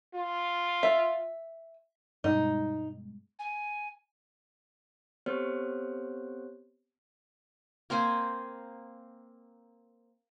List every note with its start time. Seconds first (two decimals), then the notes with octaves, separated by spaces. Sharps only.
0.15 F4
0.83 E5
2.24 G2 B2 G#3 D#4
3.39 G#5
5.26 B3 C4 G4 A4 C5 C#5
7.90 A#3 C4 C5 G#5